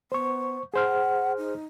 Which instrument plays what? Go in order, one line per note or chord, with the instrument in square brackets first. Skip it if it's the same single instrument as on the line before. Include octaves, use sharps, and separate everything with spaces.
[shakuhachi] B3 [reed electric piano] C5 C#6
[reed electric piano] G#4 C5 F6 [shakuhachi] F#5
[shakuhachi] D#4